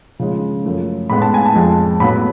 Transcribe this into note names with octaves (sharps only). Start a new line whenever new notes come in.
C#3 F3 G#3
F#2 F3 A3
A2 G#3 B3 B5
A5
G#5
A5
F2 F3 G#3
A2 F#3 B3 B5